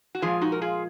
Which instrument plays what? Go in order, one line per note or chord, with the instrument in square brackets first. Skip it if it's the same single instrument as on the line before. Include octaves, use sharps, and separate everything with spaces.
[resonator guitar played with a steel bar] F#4
A#2 F3 G#3 F4 G#4
D#4 F#4
A#4
F4 G#4